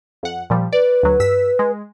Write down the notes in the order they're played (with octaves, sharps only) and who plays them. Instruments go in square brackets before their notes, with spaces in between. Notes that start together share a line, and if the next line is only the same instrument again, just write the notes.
[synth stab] F2 F#5
A#2 F3 G3
[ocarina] B4 [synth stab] D5
[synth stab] D2 F#3
G2 E6 B6
G#3